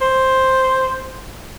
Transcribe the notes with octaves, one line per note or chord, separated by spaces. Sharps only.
C5